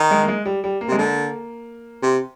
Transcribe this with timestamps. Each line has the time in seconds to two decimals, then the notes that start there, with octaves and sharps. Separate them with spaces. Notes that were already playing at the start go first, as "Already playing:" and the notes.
Already playing: D#3
0.11 G#3
0.23 A#3
0.28 G#3
0.45 G3
0.64 G3
0.81 A#3
0.88 C3 G#3
0.98 D3 A#3
2.03 C3